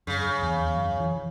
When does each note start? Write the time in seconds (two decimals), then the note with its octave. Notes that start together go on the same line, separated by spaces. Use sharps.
0.07 F#2 C#3
0.42 E2
0.65 E2
0.76 F#2
1.00 E3
1.15 E3